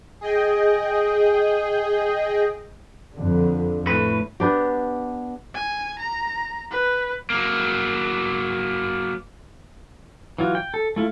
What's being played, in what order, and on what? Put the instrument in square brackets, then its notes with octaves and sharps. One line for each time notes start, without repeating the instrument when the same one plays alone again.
[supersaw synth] G#4 D#5 G5
[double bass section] F2 D3
[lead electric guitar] A2 B4
[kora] B3 D4 G4
[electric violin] G#5
A#5
B4
[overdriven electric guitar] F#3 A#3
[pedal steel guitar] E3 F#3 F4
G5
A4
A3 E4 F4